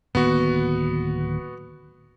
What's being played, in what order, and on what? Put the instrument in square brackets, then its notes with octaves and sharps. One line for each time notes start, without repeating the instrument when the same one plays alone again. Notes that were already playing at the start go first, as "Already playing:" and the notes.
[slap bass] D1 D#3 A#3 [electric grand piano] B3 F#4